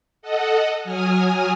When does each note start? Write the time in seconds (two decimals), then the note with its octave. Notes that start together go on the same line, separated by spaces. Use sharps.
0.22 A4 D#5 F#5
0.84 F#3 G#5 D#6 F6